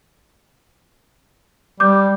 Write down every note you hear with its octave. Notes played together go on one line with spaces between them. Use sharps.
G3 D6 G6